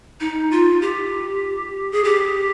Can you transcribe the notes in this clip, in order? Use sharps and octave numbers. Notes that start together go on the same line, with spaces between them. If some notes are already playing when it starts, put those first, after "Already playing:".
D#4
F4
G4
G#4
G4